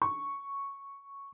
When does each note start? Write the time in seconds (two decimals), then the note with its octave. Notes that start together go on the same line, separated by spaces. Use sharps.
0.02 C#6